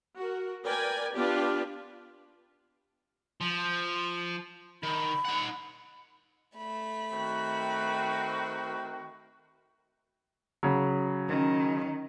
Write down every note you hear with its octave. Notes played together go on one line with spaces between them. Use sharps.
F#4 A#4
A#4 B4 D5 G5 G#5
B3 D4 F4 G4 B4 D5
F3
D#3 B5
D#4 F#5
A3 B5
D#3 C4 F#4
C#3 F#3
D#3 C#4